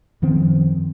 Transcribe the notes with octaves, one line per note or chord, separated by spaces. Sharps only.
F#2 D#3 F3 C4